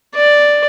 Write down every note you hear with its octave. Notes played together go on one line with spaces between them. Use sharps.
D5